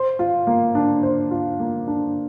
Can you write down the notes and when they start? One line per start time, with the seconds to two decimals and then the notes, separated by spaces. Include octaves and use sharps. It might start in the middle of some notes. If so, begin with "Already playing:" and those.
Already playing: C5
0.19 F4
0.47 A#3
0.75 D4
1.03 C5
1.31 F4
1.60 A#3
1.87 D4